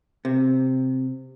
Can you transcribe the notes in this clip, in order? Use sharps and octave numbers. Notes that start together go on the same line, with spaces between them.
C3